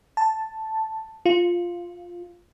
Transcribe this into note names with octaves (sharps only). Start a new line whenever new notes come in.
A5
F4